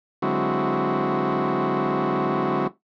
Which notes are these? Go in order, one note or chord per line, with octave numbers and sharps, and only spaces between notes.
D3 F#3 G#3 C4 E4 F#4